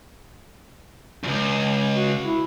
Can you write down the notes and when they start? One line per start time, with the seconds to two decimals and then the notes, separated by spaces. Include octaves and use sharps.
1.24 C#2 F#2
1.95 F#4
2.24 E4